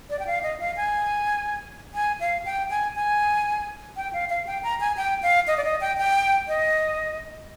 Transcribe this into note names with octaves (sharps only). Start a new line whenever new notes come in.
D5
G5
F5
D#5
F5
G#5
G#5
F5
G5
G#5
G#5
G5
F5
F5
G5
A#5
G#5
G5
F5
D#5
D5
D#5
G5
G5
D#5